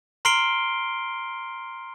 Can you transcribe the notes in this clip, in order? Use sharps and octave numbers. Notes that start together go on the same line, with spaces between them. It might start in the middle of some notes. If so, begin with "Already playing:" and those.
A#5 C6 F6 C7 D7 G7